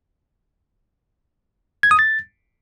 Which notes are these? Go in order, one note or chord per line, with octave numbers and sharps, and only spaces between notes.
G#6
D#6
A6